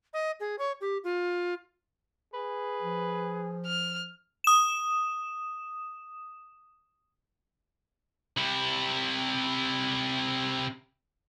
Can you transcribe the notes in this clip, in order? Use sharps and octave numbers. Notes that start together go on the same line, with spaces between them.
D#5
G#4
C#5
G4
F4
G#4 B4
F3
F6
D#6 E7
C3 E4